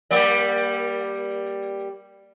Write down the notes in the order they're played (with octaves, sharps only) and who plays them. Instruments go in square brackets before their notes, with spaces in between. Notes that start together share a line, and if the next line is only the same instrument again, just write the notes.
[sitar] G3 A#3 D5